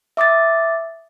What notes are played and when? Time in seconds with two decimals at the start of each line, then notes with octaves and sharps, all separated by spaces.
0.17 E5 D6 D#6 A6